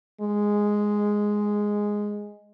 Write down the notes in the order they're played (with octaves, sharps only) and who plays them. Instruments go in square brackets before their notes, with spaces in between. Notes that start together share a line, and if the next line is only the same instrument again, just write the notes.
[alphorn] G#3